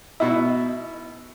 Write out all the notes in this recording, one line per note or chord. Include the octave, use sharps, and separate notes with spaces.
B2 D#4 E4